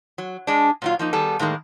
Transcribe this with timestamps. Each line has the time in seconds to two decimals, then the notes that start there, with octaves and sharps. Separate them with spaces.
0.18 F#3
0.47 G#3 D4
0.82 A#2 F#3 F4
0.99 F3 A#3 D#4
1.13 D#3 G3 B3 G#4 A4
1.39 A2 D#3 G#3 A#3